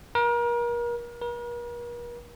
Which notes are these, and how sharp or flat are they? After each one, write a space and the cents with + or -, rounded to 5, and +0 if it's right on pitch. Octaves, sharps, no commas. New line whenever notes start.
A#4 +35
A#4 +45